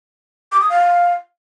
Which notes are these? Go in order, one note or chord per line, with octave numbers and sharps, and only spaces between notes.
D6
D#6
F5